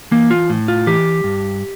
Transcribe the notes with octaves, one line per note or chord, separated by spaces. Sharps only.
E3 A#3
F4
A2
F4
E3 G4
G2